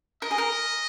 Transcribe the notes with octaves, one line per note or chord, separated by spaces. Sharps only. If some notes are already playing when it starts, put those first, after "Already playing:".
A#4 D#5
G#4
A#4